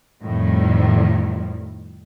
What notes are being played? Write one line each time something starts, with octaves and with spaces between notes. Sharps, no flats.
F2 A2 D#3 F3 G3